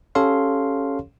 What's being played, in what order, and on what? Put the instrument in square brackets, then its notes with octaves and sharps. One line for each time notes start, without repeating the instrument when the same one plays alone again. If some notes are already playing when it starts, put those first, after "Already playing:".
[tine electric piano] C#4 G4 A4 C#5 F5 C6